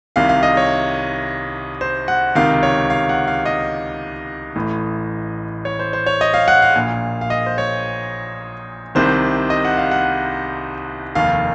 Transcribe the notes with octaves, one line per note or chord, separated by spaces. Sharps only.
C2 C3 D#3 F5
F5
D#5
C#5
C5
F#5
C#2 C3 D#3 F5
C#5
F5
F#5
F5
D#5
A1 A2
C#5
C5
C5
C#5
D#5
F5
F#5
F5
A#1 A#2
F5
D#5
C5
C#5
C2 C3 D#3 C5
D#5
F#5
F5
F#5
F1 D#2 D#3 F5